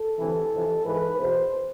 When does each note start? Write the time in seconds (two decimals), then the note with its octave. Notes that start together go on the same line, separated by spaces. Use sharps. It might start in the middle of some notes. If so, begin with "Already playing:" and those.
Already playing: A4
0.19 D2 C3 E3
0.52 F2 C3 E3
0.86 G#2 E3 B4
1.19 E2 B2 C5